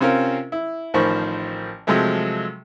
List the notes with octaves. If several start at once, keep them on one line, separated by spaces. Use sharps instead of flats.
C3 C4 C#4 F4 A#4
E4
A1 D#3 F3 C5 B5 C#6
C3 F3 F#3 G#3 A3